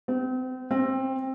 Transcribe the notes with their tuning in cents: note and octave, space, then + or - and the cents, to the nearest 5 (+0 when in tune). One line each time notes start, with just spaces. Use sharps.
C4 -35
C4 +20